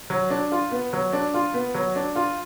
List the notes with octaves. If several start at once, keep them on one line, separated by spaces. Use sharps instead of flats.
F#3
D4
F4
B3
F#3
D4
F4
B3
F#3
D4
F4